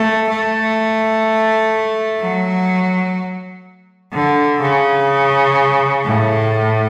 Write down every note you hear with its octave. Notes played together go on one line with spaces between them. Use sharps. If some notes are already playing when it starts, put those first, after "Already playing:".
Already playing: A3
A3
F#3
D3
C#3
A2